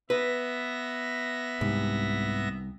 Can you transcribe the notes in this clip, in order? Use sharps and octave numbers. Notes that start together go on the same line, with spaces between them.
B3 B4 E5 A#6
C2 G#2